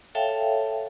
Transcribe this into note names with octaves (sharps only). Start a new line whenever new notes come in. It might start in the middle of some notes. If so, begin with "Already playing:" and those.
A4 C#5 E5 F5 G5 A5